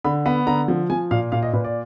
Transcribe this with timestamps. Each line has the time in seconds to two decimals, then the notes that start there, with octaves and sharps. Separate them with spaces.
0.04 D3 B5
0.26 B3 B5
0.47 D3 A#5
0.68 F3
0.90 F3 G#5
1.11 A#2 F5
1.32 A#2 F5
1.43 D#5
1.53 A#2 B4
1.64 D5